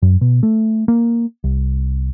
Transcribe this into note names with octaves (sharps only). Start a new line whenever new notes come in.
F#2
B2
A3
A#3
C2